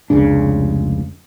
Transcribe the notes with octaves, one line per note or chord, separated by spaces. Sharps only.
F1 C#2 C#3 D4